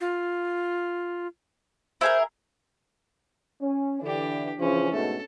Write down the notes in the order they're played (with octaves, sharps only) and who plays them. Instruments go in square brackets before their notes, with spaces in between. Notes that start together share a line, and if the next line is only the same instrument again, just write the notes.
[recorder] F4
[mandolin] E4 G#4 A#4 [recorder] C5
[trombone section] C#4
[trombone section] D3 E3 [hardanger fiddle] D4 G4
[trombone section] C#3 E3 F3 [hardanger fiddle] C#4
[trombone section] G#2 B2 A3 [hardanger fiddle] A4